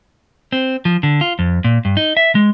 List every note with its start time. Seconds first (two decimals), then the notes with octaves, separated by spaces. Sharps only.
0.52 C4
0.85 F3
1.03 D3
1.21 F4
1.39 F2
1.64 A#2
1.85 G2
1.97 D#4
2.17 E5
2.35 G#3